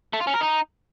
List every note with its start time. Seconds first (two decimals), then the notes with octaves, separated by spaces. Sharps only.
0.13 A3
0.20 F4
0.27 C#4
0.34 A#4
0.41 D#4